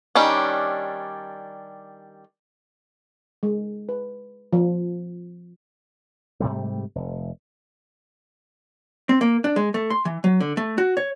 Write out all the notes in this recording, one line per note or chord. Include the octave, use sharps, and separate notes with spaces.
D#3 G3 C#4 D4
G#3
B4
F3
G#2 C3 G3 A3
F1
C4
A#3
D4
G#3
A3
C6
E3
F#3
D3
A3
F#4
C#5